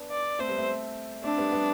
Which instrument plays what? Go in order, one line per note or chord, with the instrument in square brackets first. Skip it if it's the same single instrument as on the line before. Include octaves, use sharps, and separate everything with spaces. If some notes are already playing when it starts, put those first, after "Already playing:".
Already playing: [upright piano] B3 D4
[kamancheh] D5
[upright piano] A3 C4 [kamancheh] C5
[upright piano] G3 B3
A3 C4
[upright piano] A3 C4 [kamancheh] D4
[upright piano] G3 B3
G3 B3